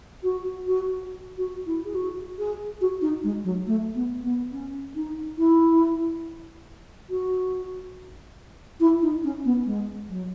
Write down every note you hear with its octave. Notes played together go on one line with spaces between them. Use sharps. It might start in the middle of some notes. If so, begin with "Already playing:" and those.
F#4
F#4
F#4
E4
G#4
F#4
G#4
F#4
D#4
G#3
F#3
A3
B3
B3
C#4
D#4
E4
F#4
E4
D#4
C#4
B3
G#3
F#3